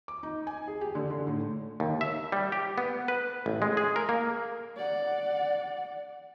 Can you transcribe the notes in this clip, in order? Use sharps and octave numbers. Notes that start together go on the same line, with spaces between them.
D6
D#4
G#5
G#4
G4
D3
D3
A2
D#2
E5
G3
G4
B3
B4
A1
G#3
G#4
A#4
A#3
D5 F#5